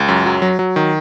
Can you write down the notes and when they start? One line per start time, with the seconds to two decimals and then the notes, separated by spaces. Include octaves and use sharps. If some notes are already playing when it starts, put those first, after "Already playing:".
Already playing: C#2
0.08 F#2
0.26 F#3
0.42 F#3
0.59 F#3
0.76 D#3